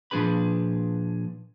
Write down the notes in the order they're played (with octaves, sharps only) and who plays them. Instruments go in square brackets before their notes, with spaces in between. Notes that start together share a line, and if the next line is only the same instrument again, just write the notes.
[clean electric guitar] A#2 F3 D4 G#4 B4 B5